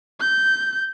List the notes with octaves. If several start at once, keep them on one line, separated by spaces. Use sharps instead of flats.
G6